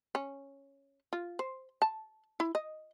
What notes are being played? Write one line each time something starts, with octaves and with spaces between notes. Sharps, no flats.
C#4
F4
C5
A5
E4
D#5